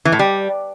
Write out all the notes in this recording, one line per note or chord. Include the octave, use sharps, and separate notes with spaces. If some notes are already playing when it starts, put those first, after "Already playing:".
E3
A2
G3